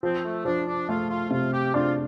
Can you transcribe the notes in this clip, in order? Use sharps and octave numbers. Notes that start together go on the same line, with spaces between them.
F3 C4
A3
F3 D4
D4
A3 F4
F4
C3 F4
G4
D4 F4